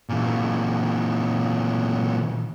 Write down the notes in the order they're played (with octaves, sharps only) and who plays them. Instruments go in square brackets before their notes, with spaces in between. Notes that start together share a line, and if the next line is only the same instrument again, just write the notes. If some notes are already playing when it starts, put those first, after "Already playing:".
[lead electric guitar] A#2 E3